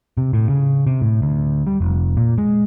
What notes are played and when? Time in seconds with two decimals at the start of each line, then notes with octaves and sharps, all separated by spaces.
0.17 C3
0.33 A2
0.49 C#3
0.87 C3
1.02 A2
1.22 D2
1.67 G3
1.81 F1
2.17 A#2
2.38 G#3